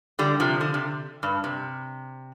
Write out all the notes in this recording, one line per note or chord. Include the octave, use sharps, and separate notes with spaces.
D3 G3
C3 F3
D3
C3
G2
C3